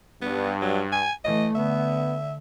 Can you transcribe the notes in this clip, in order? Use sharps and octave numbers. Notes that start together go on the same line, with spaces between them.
G2 B3
F#3
G#5
E3 A3 D#5
D3 B3 E5